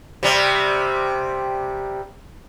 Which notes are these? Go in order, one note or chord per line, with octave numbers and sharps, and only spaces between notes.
C3 G3